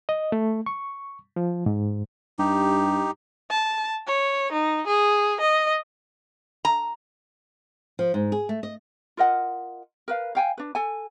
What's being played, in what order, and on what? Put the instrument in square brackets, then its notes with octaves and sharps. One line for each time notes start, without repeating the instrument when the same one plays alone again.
[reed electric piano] D#5
A3
C#6
F3
G#2
[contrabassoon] G2 [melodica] D#4 G4
[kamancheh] A5
C#5
D#4
G#4
D#5
[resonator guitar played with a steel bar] A#5
[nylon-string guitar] F3
G#2
G#4
A3
D#5
[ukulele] F4 A#4 D#5 F#5
A#4 B4 F5
F5 G5 G#5
D4 B4
A4 G#5